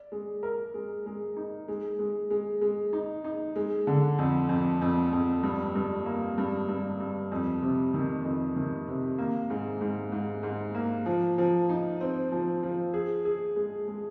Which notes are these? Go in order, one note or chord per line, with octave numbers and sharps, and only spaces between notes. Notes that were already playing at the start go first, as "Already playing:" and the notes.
Already playing: D5
G#3
A#4
G#3
G#3
D#4
G#3
G#3
G#3
G#3
D#4
D#4
G#3
D3
F2
F2
F2
F2
G2
G2
A#3
G2
G2
G2
F2
C3
D#3
F2
D#3
C3
A#3
G#2
G#2
G#2
G#2
A#3
F3
F3
D#4
C4
F3
F3
G#4
G#4
G#3
G#3